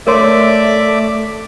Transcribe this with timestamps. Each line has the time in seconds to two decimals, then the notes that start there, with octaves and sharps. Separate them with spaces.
0.07 A3 A#4 C#5 D5 E5 C6 D6